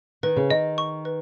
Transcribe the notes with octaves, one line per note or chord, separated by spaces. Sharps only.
D#3 B4
C#3
D#3 D#5
C#6
B4